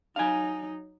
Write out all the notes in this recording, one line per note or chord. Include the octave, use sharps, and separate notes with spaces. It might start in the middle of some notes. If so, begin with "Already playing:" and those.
F#3 D#4 F5 G#5